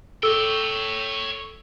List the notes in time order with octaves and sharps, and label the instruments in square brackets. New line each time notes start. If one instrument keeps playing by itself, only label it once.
[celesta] A4 E6 [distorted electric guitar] C#5 G5